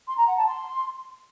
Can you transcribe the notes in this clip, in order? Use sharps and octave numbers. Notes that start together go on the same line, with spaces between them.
C6
A#5
F#5
A5
C6